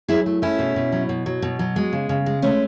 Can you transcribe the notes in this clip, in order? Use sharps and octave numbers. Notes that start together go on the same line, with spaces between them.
F#3 E4 G#4
A3
A3 C#4 E4
B2
B2
F#3
B2
F#3
B2
F#3
G#3
C#3
C#3
G#3
G#3 A3 C#4